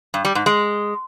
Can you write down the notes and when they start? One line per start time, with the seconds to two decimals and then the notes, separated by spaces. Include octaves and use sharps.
0.14 G2
0.25 G3
0.35 G#2
0.46 G#3